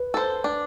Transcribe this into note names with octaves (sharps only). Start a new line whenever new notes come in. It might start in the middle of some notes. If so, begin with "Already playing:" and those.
Already playing: B4
A4 C5
D4